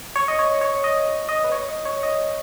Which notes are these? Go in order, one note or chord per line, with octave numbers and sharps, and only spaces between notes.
C#5
D#5
C#5
C#5
D#5
D#5
B4
C#5
D#5
C#5
D#5